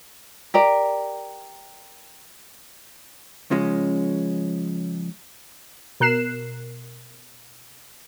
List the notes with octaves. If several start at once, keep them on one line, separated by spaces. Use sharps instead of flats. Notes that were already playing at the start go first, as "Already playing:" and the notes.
G4 A#4 D5
C#3 F3 G#3 C#4
B2 A#4 F#6 C7 E7